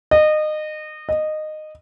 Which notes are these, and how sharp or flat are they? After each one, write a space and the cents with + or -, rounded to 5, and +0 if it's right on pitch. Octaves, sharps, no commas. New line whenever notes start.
D#5 -25
D#5 -15